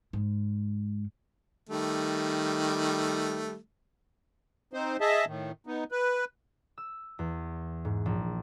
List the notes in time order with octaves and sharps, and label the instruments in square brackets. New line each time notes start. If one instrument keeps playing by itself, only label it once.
[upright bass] G#2
[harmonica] D#3 G3 A3
[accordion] C4 D#4 C5
G#4 D#5 E5 A5
A2 D#3
B3 D#4
B4
[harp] E6
E2
G#2
A#1